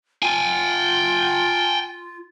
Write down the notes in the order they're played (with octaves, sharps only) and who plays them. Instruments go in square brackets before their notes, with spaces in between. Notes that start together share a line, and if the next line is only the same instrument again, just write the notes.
[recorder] F4 [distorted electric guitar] G5 G#5